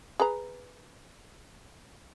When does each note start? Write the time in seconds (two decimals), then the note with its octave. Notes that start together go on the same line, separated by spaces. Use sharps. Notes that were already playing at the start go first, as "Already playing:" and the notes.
0.20 G#4 B4 A#5